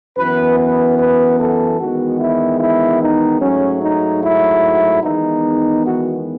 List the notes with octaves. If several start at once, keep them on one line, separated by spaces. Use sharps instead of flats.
F#2 E3 B3 B4
B4
B4
A4
E2 D#3 G#3 B3 F#4
E4
E4
D#4
G#2 F#3 A3 C#4
D#4
E4
E2 D#3 G#3 B3 D#4
F#4